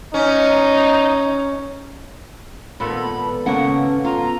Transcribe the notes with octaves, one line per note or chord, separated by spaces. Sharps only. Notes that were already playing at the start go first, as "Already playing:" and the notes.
C#4 D#4
G#1 A#2 B3 A4 B5
C#3 A#3 C#4 F#5
F4 A#5